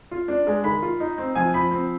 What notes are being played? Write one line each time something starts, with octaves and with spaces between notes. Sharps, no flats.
F4
D4
G#3
D#3 B5
F4
D#4
C4
F3 G#5
F3 B5
C4